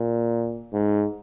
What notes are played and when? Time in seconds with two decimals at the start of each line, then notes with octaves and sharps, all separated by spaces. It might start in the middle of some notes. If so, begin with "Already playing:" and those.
Already playing: A#2
0.73 G#2